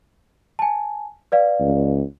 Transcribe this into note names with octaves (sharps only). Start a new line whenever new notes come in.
G#5 A5
B4 D5 F5
C#2